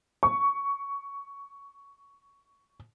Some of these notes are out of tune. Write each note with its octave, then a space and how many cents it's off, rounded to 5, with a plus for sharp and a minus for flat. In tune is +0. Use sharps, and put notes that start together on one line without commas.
C#6 +10